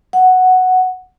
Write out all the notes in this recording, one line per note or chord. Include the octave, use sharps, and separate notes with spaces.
F#5